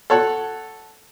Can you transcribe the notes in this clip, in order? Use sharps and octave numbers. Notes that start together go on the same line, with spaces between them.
A4 C#5 F#5